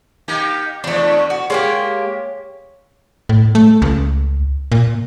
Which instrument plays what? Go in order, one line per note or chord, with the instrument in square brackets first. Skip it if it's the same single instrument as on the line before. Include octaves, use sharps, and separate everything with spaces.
[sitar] A#3 D#4 G4
[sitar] E2 F3 [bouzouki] A3 D4
[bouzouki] F#4
[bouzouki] G#3 A#3 G4 [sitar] C#5
[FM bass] A2
A3
C#2
A#2